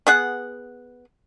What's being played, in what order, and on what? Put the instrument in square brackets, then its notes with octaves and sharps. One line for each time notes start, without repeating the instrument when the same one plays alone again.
[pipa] B3 G#4 F#5